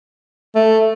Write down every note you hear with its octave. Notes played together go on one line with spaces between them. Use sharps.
A3